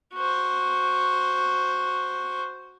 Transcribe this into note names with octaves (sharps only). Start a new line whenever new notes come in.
F#4 C5